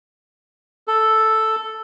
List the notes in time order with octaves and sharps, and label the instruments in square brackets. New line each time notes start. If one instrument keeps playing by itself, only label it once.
[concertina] A4